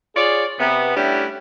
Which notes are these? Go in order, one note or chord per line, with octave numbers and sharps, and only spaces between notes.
F4 G#4 C#5 D5
C3 B3
G3 A3 C#4 D4 E4